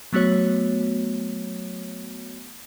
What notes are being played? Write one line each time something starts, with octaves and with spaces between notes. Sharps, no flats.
F#3 A3 B3 F#4 C#5